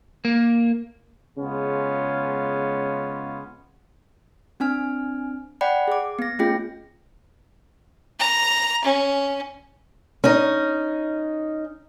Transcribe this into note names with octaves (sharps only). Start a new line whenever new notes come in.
A#3
C#3 G#3 B3 C#4 F4
C4 D4 G#5 F6
D5 F#5 G5 B5
G#4 D6
B3 A#6
A3 C#4 F4 G#4 G5 A#6
A#5
C#4
C#4 D#4